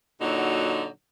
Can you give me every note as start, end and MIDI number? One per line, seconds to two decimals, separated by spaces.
0.21 0.88 46
0.21 0.88 50
0.21 0.88 54
0.21 0.88 63
0.21 0.88 66